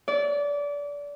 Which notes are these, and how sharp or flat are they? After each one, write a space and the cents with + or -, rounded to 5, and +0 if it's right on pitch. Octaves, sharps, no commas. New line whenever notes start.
D5 -25